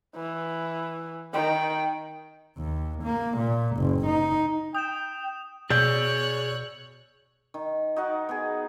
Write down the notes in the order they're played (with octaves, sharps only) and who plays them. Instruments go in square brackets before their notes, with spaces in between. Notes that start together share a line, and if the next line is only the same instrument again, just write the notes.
[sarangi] E3
[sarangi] D#3 [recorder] G5
[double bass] D#2
A#3
A#2
F#1
D#4
[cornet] G5 [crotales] D#6 E7
[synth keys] B2 E6 [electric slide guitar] G#4 D5 [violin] C#5 F#6 [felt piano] G6
[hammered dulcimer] D#3
D#4 F#4 A#4 F#5
B3 G#4